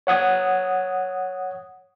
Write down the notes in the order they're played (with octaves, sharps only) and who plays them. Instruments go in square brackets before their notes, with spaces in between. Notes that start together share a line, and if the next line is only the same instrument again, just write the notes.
[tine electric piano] C#5 F#5 D#6 G#6